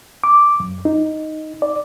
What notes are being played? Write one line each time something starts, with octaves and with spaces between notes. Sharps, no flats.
D6
F#2
D#4
D5